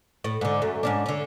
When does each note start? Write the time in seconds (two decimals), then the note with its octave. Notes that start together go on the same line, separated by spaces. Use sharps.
0.24 A2
0.41 G#2 D3
0.62 F#2 A3
0.83 G#2 C#4 D4
1.06 D3 C#4